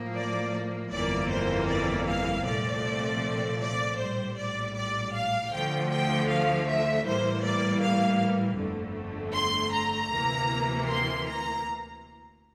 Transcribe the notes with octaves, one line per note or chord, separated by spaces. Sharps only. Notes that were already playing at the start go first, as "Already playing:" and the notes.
Already playing: A2 F3 A#3
D5
G1 F2 E3 A#3 D5
C5
D5
F5
C2 A#2 F3 A3 C4 D5
D5
A#1 A2 G3 C5
D5
D5
F5
D2 D3 F3 A3 G5
G5
F5
E5
A2 E3 G3 A#3 C5
D5
F5
G1 F2 D3 A3
C6
A#5
D2 C3 E3 A#3
C6
A#5